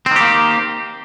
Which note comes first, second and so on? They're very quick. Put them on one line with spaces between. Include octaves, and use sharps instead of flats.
C4 D#3 G4 A#3